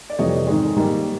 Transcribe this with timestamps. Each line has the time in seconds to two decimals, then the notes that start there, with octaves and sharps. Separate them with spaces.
0.10 D5
0.19 F2 C3 E3 G3 C#5 D#5
0.47 G#2 D#3 G#3
0.76 G#2 D#3 G3 A#3